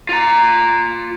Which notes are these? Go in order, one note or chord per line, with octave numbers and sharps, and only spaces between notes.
F4 A#5